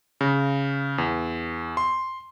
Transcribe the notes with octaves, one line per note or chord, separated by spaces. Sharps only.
C#3
E2
C6